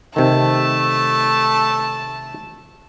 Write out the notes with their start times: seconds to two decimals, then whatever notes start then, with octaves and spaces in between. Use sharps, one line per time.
0.16 C3 D#3 A3 A5